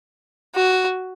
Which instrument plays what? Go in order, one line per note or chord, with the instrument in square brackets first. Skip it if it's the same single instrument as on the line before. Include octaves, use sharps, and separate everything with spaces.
[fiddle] F#4